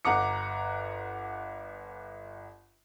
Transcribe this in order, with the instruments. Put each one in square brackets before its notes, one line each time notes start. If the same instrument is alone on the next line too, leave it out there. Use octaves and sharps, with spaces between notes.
[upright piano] G1 F#5 A#5 D6 C#7